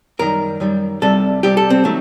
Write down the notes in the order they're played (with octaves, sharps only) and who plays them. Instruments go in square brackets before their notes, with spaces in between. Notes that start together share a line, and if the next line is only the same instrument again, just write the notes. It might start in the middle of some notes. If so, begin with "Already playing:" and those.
[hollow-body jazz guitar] F#2 D#3 G3 A#4
F#2 D#3 G3
C2 C3 G3 A4
C2 C3 G3 G4
A4
C4
D#3 F#3 A3